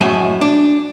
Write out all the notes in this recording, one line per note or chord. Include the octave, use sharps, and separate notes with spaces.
F#2 A2 G#3 E5 G#5 A5
D4